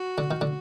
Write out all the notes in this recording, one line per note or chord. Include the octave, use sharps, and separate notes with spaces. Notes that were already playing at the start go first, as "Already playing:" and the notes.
Already playing: F#4
D3
D#3
D3